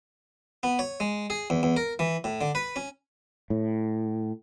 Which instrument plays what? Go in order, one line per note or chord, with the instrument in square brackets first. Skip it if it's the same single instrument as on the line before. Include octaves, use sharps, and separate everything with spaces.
[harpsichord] B3
C#5
G#3
G#4
E2
E2
A#4
E3
A2
D3
B4
C#4
[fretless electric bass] A2